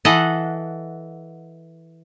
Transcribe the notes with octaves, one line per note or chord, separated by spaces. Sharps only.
E3 A4 D#5 F#5